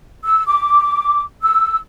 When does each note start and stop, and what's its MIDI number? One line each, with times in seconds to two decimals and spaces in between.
0.24 0.43 88
0.47 1.22 86
1.42 1.77 88